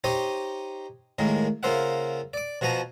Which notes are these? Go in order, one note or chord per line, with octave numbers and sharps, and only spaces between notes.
D#4 G4 C5 C#5 D#5
A2 D#3 G#3 A#3
C#3 A#3 F4 C5 E5 F#5
D5 D6
B2 F3 F#4 G#5 A#5